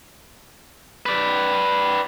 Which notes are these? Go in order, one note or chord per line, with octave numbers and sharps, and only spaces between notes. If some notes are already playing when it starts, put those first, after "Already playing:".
B4 D5